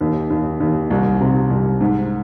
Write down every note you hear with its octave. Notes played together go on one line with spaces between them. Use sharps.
D#2
D#2
D#2
C2
C3
C2
G#2